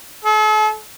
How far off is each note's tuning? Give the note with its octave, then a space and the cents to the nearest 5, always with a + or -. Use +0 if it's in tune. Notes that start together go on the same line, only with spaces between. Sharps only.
A4 -45